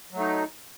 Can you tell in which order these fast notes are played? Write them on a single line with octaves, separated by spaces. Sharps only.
F#3 A3 D#4